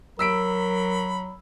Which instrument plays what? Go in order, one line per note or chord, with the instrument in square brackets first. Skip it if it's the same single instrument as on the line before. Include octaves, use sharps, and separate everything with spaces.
[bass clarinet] F#3 [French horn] A#4 [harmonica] B5 [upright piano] E6 B6 D7